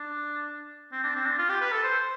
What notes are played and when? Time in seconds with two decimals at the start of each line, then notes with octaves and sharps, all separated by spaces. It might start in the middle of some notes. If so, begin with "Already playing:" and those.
Already playing: D4
0.92 C4
1.04 D4
1.15 C4
1.26 D4
1.38 F4
1.49 G4
1.61 B4
1.72 A4
1.84 C5